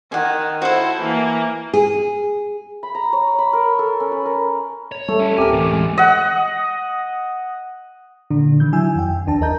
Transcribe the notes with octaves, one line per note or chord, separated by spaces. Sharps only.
D#3 F#5 G#5
E4 F#4 A4 C5
E3 A#3
G#4
B5
A#5
C#5
B5
A#4
A4
C#4
B4
A#4
C#5
G3 A3
C#4 E4
D1 C4 G4 A#4 G#5
A2 E3
E1 G#3
D#5 F#5
A#2 D3 D4
D#3 G6
F#3 E4 G#5 E6
F2 G5
G1 D#2 D4 A5
A#4 D#5 A#5 G6